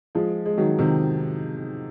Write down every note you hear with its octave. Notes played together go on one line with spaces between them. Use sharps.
F3 G#3
G#3
D#3 F#3
C3 D#3